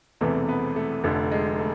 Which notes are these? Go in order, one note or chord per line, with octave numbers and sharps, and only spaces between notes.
E1 E2 C3 E3 A3
B3
A3
F1 F2 D3 A3
G#3
A3